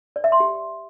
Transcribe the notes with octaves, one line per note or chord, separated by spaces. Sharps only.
D5
E5
C6
G4